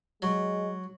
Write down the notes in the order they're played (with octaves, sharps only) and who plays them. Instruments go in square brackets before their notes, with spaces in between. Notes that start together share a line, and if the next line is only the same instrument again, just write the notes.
[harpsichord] F#3 [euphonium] G#3